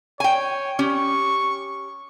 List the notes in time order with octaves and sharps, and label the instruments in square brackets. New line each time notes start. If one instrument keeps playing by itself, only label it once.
[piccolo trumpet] C#5 [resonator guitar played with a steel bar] G5 G#5
[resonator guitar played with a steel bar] C#4 G4 [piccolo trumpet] C#6